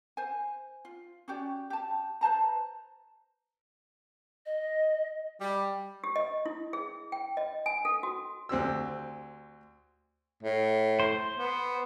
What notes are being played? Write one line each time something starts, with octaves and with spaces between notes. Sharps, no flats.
C5 G#5
F4
C#4 F#4 G4 D5
G4 A5
B4 C5 A5 A#5
D#5
G3
G4
D#5
E4
G#4
G5
D#5
G#5
A4
F#4
D2 C4 G4 E6
A2
C5
B3